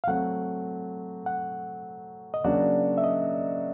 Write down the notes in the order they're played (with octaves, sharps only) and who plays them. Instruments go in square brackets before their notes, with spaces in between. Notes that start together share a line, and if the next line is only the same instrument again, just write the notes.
[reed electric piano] F5
[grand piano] F#3 A3 C4 [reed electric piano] F#5
[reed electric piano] F#5
D#5
[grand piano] C#3 F#3 A#3 D4 F#4 [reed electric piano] D5
[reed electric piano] E5
D#5